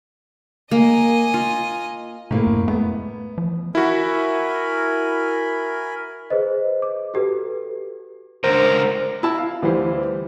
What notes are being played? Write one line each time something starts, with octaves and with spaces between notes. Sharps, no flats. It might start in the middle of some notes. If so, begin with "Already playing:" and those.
A#3 D#5 G#5
F4
A2 C3 A#3
F#2
A3 B3
F3
E4 F#4 A#4 G#5 B5
G#4 B4 C5 D#5
D6
F#4 G4 A4 B4
C#2 D3 A#4 C5
E4 A5 E6
F5
D2 E3 G3 E4 C5